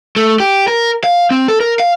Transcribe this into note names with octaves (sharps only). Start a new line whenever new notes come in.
A3
G4
A#4
F5
C4
A4
A#4
F5